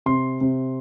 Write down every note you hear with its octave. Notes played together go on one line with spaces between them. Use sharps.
C3 C6
C3